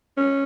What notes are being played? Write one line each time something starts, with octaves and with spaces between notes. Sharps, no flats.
C#4